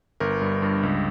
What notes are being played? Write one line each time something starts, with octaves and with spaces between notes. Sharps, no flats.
G1 A#4
G2
G2
C#2